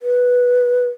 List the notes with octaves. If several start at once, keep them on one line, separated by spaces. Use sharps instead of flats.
B4